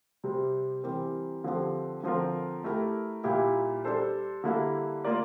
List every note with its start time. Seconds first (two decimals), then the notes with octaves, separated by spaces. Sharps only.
0.24 C3 G3 C4
0.84 E3 G3 C4 G4 A#4
1.44 D3 F3 C4 G4
2.03 D3 F3 C4 F4 A#4
2.64 A3 E4 G4 A#4
3.24 A#2 G3 A#3 E4 G4
3.85 G3 D4 A4 C5
4.44 D3 G3 A#3 E4
5.05 A#3 F4 A#4 D5